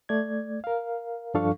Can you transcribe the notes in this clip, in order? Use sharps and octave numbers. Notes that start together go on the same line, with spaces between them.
A3 D5 G#6
A#4 F5
G2 F3 D4 A4 F5 C#6